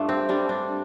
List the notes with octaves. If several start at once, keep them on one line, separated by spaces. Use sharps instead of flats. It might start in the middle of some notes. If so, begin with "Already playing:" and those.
Already playing: G2 A3 D4 F4
C4
G3 D4
D4